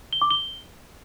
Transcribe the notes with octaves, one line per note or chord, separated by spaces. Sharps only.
G7
D6
G7